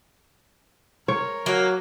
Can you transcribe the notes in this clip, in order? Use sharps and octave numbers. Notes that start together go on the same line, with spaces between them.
A#4 C#5
F#3 A#3